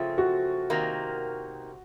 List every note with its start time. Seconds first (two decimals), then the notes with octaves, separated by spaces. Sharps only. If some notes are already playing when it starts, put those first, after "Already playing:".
Already playing: C#3 F3 A3 C4 F4
0.18 F#4
0.70 C3 D#3 A#3